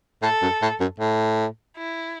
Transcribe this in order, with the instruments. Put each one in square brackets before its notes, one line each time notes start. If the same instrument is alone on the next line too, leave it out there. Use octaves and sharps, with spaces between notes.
[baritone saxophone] A2 [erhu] A4
[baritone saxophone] F#2
A2
F#2
A2
[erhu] E4